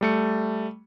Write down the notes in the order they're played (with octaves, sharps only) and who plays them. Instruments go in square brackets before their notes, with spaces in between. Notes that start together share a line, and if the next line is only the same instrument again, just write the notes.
[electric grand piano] G3 A3 C#7